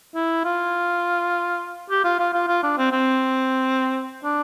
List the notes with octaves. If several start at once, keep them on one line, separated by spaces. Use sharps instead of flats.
E4
F4
G4
F4
F4
F4
F4
D4
C4
C4
D4